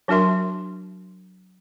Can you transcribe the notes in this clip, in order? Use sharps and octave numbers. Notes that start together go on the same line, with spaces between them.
F#3 D4 F#4 A#4 E5 C6